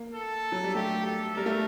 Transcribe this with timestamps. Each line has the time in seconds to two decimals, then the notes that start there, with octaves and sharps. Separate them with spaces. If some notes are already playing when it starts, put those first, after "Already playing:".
Already playing: A#3
0.13 A4
0.52 F#3
0.64 G3
0.75 A3 G4
1.06 A4
1.37 G3 A#4
1.46 A3